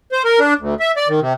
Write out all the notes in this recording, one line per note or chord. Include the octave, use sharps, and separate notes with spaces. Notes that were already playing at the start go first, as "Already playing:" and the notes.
C5
A#4
D4
D2
E5
D5
D#3
C3